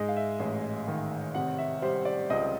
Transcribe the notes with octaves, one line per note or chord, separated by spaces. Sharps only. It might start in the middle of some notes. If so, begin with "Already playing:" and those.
Already playing: G#2 G#3 D#5
F5
E5
A1
D#3
C3 F#5
E5
G3 C5
D5
C#2 D#5